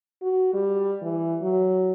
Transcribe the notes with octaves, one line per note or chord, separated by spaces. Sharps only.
F#4
G3
E3
F#3